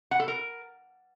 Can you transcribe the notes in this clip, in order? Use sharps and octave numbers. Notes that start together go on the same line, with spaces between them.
F#5
A4
A#4